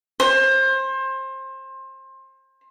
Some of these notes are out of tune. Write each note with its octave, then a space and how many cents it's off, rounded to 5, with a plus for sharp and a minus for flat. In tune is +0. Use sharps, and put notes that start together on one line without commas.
C5 +25